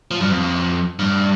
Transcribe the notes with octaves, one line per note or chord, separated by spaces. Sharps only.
F3
G2
F2
G2